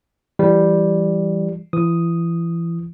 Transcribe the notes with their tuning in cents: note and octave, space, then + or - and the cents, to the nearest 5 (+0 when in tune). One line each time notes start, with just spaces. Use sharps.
E3 +25 G3 +0
E3 +30 D#6 +0